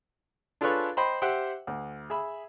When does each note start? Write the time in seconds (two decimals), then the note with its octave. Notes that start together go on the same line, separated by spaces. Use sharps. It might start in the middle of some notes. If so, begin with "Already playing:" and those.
0.61 D4 F4 G#4 A4 B4 C#5
0.97 C5 D#5 G5 B5 C6
1.22 G4 C5 E5 F#5 G5
1.67 D2
2.10 G#4 E5 B5